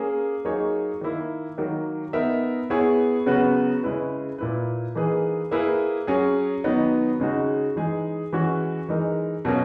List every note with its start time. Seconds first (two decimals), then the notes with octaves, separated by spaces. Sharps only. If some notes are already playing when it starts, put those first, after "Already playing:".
Already playing: A#3 C#4 G#4
0.45 F#3 A#3 D#4 G#4 C#5
1.01 D#3 A#3 E4
1.58 D#3 F#3 A#3
2.13 B3 D#4 A#4 E5
2.70 B3 E4 G#4 C#5
3.26 C#3 F#3 B3 F#4 B4
3.83 C#3 G#3 C#4 E4 B4
4.38 A#2 A#3 E4 B4
4.95 E3 A#3 D#4 G#4 B4
5.51 A#3 E4 G#4 B4
6.07 F#3 C#4 G#4
6.64 D#3 F#3 B3 D#4
7.20 C#3 G#3 D#4 F#4
7.76 E3 G#3 D#4 G#4
8.33 E3 G#3 C#4 F#4 C#5
8.88 E3 G#3 D#4 A#4
9.45 B2 F#3 A#3 C#4